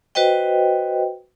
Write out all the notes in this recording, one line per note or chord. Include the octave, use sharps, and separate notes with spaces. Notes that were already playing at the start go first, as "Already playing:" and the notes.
F#4 B4 C5 D#5 G5